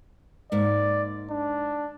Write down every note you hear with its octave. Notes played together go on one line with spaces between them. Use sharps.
G#2 A#3 D5
D4